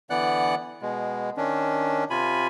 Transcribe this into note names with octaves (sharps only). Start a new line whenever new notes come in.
D3 E3 B3 D5 F#5 F#6
B2 G#3
D#3 C#4 D4
C3 F4 G#5 B5